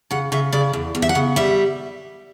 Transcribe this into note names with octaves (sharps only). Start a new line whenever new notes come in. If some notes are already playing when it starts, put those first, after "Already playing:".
C#3 F#5
C#3 E5
C#3 D5
E2
E2
E5
F#5
C#3
G3 E5